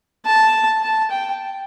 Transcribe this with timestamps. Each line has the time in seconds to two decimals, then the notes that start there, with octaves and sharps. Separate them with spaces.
0.26 A5
0.83 A5
1.11 G5